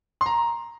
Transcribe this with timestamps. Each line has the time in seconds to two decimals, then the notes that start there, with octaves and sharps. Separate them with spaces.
0.21 C6
0.26 A#5